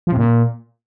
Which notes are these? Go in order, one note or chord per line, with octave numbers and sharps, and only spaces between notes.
F3
C3
A#2